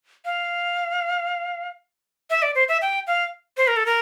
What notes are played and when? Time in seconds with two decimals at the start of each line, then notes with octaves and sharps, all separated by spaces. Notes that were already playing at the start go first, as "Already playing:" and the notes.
0.25 F5
2.30 E5
2.42 D5
2.55 C5
2.69 E5
2.82 G5
3.07 F5
3.57 C5
3.67 A#4
3.77 A4
3.86 A#4